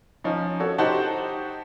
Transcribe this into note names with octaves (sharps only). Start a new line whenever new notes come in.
F3 C#4 D#4
F#4 A4 C#5
D#4 F#4 G4 C5 F#5 A5